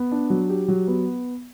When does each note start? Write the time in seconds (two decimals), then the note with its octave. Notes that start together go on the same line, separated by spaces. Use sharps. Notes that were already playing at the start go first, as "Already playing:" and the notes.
Already playing: B3
0.12 D4
0.30 F#3
0.50 G4
0.68 F#3
0.88 B3